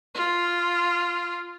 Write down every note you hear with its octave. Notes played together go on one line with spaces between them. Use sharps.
F4